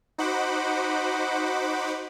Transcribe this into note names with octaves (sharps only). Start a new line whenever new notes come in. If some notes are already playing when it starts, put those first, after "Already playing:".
D#4 F#4 C5 F#5 B5 D6